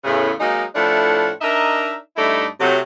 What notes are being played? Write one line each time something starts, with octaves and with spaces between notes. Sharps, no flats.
E2 A2 C#3
F#3 G#3 A#3 D#4
A2 F3 A3 D4 E4 F#5
D4 D#4 A#4 D#5 E5
G2 A3 D#4 E4 A4 D5
C3 F#3 A3